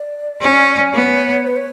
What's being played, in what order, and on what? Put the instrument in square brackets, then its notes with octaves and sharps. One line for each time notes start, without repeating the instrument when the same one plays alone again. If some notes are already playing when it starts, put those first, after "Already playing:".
Already playing: [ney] D5
[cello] C#4
[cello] B3 [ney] C#5
[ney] B4
C#5